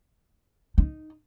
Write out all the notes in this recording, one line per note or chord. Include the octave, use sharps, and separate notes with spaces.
D#4